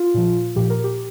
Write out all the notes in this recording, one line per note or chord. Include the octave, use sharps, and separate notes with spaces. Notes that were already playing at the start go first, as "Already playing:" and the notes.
Already playing: F4
A#2 F3
A#2 F3 G4
A#4
G4